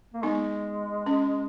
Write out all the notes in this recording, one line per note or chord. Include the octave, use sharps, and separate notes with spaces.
A#3
G#3 B3 D#4
C#4